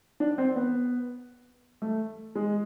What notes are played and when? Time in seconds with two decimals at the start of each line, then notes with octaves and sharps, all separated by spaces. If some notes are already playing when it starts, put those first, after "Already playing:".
0.20 D4
0.38 C4
0.56 B3
1.82 A3
2.35 G#3